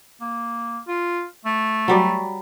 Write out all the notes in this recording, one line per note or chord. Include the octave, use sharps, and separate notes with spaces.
A#3
F4
A3
F#3 G3 D5